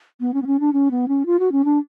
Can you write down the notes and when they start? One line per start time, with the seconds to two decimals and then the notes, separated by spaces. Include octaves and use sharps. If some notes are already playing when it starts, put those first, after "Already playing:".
0.20 B3
0.34 C#4
0.42 B3
0.47 C#4
0.60 D4
0.73 C#4
0.91 B3
1.08 C#4
1.26 F4
1.39 F#4
1.52 C#4
1.65 D4